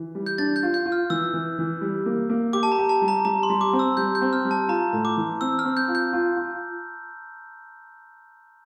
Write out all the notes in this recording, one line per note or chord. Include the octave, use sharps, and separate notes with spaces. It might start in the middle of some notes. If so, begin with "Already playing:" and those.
Already playing: E3
G3
G6
D4 A6
G6
F4
G6
F4
F6
E3 E6
E3
E3
G3
A#3
A#3
G4 D6
A5
A#5
G4
A5
G3
A#5
G3 A#5
C6
G3
D6
C4
E6
G3 G6
G6
C4
F6
G3
A5
F4 A#5
A2
D6
E3
C4 E6
F6
C4
G6
F4
G6
F4
F4